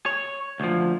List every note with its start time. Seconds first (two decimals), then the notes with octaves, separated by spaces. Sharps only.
0.06 C#5
0.60 D2 F3